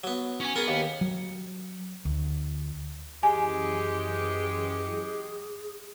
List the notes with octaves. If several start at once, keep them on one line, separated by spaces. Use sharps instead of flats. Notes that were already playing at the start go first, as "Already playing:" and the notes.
F#3 B3
C#4 G#5
B3 G#4 A#4
D#2
F#3
D2
F#2 E3 G#3 G4 G#4 G#5 C#7